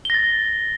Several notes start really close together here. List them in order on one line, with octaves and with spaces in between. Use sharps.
G7 A#6 A6